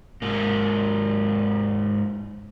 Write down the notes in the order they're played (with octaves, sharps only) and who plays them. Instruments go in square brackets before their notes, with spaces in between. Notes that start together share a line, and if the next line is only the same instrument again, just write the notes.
[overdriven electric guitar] G#2 A#3